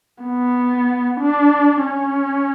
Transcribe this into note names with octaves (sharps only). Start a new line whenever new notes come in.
B3
D4
C#4